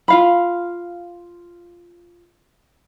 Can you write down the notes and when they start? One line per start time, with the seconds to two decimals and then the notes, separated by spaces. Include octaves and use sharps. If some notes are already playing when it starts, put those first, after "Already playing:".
0.08 F4 F5 B5